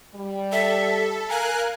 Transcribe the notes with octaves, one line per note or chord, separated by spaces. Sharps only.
G3
A4 E5
A#4 F5 G#5 F#6